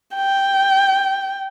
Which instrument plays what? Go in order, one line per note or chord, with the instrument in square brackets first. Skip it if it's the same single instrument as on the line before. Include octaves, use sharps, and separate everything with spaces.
[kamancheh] G5